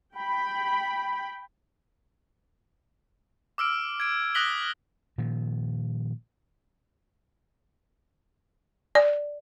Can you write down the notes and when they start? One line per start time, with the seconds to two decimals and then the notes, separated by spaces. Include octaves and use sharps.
0.16 G5 B5
3.58 D6 E6 F6 D7
4.00 G#6 D7
4.35 D#6 F#6 A#6 B6 F#7 G7
5.18 A#2 D#3 F3
8.95 D5